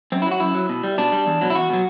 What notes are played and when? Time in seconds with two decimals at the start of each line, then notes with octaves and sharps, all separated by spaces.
0.12 F#2 C4
0.22 E4
0.26 F#3
0.31 F#4
0.40 F#2 E4
0.55 F#3
0.69 B2
0.84 G3
0.98 B2 D4
1.12 G3
1.27 E2
1.41 B2 F#3
1.50 E4
1.55 E2 F#4
1.70 B2 F#3